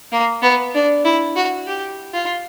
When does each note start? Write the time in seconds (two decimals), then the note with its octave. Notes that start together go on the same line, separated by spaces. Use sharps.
0.12 A#3
0.42 B3
0.74 D4
1.05 E4
1.36 F#4
1.67 G4
2.14 F4